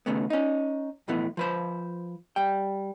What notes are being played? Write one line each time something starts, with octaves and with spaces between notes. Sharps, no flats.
D#2 C#3 A3 B3
C#4 D#4
B1 F2 A2 E3 A3 B3
F3 B4 C5
G3 G5